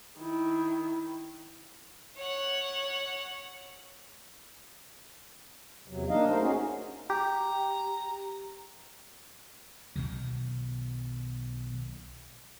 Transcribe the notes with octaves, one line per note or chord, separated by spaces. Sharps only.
D#3 E4
C#5 F#5
E2 C3 F#3
A#3 D4 D#4 D#5 F5
A3 A#4 C5
C#4 D#4 F#4 G#4
G4 A#5
B1 B2 D#3 F#3